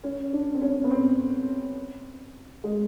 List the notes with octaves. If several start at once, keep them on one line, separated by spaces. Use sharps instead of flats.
C#4
D4
C4
C#4
B3
C4
G#3